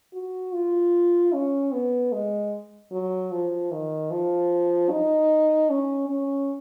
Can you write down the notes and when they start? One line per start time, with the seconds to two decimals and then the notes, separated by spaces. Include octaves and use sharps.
0.13 F#4
0.53 F4
1.33 C#4
1.72 B3
2.12 G#3
2.92 F#3
3.32 F3
3.71 D#3
4.11 F3
4.90 D#4
5.70 C#4
6.09 C#4